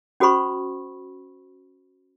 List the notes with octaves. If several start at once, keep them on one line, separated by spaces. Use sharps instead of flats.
C#4 F#4 A4 C5 B5 C#6